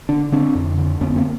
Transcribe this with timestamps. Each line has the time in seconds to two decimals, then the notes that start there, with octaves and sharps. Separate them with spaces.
0.09 D3 D4
0.32 D3 C4 D4
0.55 F2
0.78 D3
1.01 F2 B3 C#4
1.16 A#3 C4